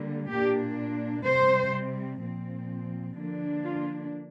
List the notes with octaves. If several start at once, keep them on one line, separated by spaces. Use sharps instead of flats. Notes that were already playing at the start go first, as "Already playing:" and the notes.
Already playing: D3 G3 A#3
A#2 A#3 D4 G4
C3 G3 C4 C5
A#2 F3 C4
D3 F3 A#3 D4
F4